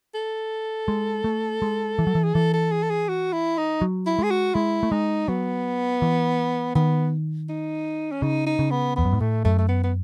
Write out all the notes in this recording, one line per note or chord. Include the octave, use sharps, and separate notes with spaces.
A4
G#3
A3
G#3
E3
F#3
E3
G#4
E3 A4
A4
G#4
A4
G#4
F#4
E4
D#4
F#3
E4
G#3 G#4
F#4
G#3 E4
A3
G#3 D#4
F#3 B3
E3
D#3 B3
D#4
C#4
C#3 D#4
D#4
C#3
B3
E2 B3
F#2
G#2
A2 A3
F#2 A3
A3
B3
B3